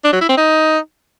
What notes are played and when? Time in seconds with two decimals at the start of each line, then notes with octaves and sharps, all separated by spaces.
0.04 D4
0.13 F#3
0.21 E4
0.29 C4
0.37 D#4